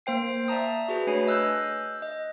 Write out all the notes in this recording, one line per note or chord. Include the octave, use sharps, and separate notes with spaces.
A#3 C5 G5 C7
D5 E5 A5 A#5 D#6
F#4 G#4 B4
A3 D4 B4 C#5 G#5 C7
D#5 E6 F#6 G6
D#5